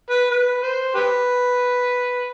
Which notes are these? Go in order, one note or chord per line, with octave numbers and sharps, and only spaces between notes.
B4
B4
C5
G4 B4